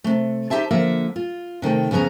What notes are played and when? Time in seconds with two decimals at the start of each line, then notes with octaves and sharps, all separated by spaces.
0.04 C3 A3
0.50 D#4 G4 C5 E5 A5
0.71 D3 F3 A#3 E5 F#5
1.16 F4
1.62 C3 D#3 A3 G5
1.91 F2 C#3 B3 C#4 A#5